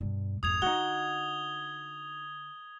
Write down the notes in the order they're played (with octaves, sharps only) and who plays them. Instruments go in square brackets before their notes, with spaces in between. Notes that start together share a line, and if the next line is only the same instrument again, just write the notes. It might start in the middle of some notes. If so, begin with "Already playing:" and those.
[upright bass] G2 B2
[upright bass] G#1 F2 [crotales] D#6 G#6 F7
[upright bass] D3 [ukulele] D#4 F#4 [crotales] G7